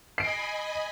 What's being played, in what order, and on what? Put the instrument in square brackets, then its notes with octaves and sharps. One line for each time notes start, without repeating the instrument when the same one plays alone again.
[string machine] D#5 G#5 B5 [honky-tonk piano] C7 D7